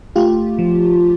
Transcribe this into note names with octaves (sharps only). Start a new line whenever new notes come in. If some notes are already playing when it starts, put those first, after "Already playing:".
A3 F4 G4
F3